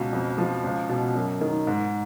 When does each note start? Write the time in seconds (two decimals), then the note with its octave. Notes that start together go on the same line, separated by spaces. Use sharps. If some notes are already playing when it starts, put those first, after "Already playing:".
Already playing: C#2 B2
0.13 F2
0.38 F3
0.64 C#2
0.89 B2
1.15 F#2
1.41 D#3
1.67 G#2